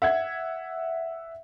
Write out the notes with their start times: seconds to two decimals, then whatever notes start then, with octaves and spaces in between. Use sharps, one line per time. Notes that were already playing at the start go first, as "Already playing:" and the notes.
0.02 E5 F#5 G#6